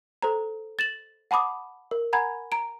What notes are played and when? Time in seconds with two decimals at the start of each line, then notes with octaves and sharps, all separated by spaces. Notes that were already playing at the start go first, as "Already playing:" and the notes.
0.22 A4 C5 A#5
0.79 A6 E7 F#7
1.31 F#5 A5 B5 D6 D#6
1.91 A#4
2.13 F#5 G#5 A#5 B5 G#6
2.52 A#5 D7